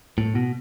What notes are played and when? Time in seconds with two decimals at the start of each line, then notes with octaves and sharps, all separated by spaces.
0.18 A2
0.35 B2